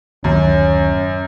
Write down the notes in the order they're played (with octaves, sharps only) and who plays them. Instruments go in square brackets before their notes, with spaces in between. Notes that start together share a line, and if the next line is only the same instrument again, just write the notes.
[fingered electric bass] D1 D#3 A#3 [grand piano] F#2 [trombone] C#4